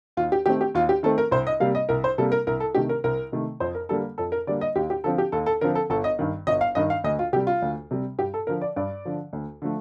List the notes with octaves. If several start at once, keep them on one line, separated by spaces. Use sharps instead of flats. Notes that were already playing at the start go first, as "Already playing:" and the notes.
D#2 F4
G4
D#3 A3 C4 G4
G4
D#2 F4
G4
D#3 A3 C4 A4
A#4
C2 C5
D#5
C3 G3 A#3 F5
D#5
C2 A#4
C5
C3 G3 A#3 A4
A#4
C2 A#4
A4
C3 D#3 A3 G4
A#4
C2 A#4
C3 D#3 A3
F2 C5
A#4
D3 G3 A#3 A4
F2 A4
A#4
D3 G3 A#3 D5
D#5
D#2 G4
G4
D3 F3 C4 A4
G4
D#2 A4
A4
D3 F3 C4 A#4
A4
G1 A4
D#5
G2 D#3
G1 D#5
F5
G2 D#3 D#5
F5
D2 D#5
F4
C3 G3 G4
F4
D2
C3 G3
G2 G4
A4
D3 F3 A#4
D5
G2 D5
D3 F3
D2
D3 F3 A3